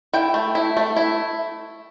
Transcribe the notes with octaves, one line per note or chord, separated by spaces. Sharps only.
E4 G5
A3
E4
A3
E4